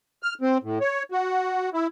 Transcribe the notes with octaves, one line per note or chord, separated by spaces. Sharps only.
F6
C4
A2
C#5
F#4
E4